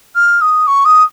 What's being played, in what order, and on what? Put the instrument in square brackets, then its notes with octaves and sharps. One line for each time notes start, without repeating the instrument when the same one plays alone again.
[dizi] F6
D#6
C#6
D#6